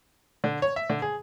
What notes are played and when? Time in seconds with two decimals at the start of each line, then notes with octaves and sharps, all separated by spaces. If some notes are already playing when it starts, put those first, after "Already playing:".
0.44 D3
0.62 C#5
0.76 E5
0.90 D3
1.02 G#4